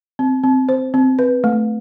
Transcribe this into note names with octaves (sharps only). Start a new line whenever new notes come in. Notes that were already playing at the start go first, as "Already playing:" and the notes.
C4
C4
C5
C4
B4
A3